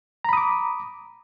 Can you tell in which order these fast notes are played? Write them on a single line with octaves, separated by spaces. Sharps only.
A#5 B5 D#6 D6